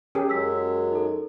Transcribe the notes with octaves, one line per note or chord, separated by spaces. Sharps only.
C#4 G4 G#4 A#4
F#2 F#3 G#3 E6 B6
D#4 A4